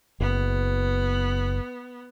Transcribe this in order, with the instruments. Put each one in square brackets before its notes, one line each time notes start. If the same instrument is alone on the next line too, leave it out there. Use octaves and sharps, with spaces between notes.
[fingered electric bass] F#1 [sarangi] B3